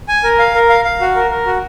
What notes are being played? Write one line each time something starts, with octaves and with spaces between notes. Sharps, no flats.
G#5
A#4
F5
A#4
F5
F5
F#4
A#4
A#4
F#4